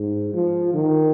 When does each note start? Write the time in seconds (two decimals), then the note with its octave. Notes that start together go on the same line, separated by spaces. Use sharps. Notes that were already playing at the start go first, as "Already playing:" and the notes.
Already playing: G#2
0.34 F3
0.74 D#3